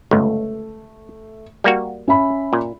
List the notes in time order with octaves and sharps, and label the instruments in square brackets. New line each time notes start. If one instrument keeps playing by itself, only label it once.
[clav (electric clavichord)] G1 C#2 [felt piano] A3
[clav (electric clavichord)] G3 A#3 F#4
[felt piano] C#4 E5 B5
[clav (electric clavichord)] A#2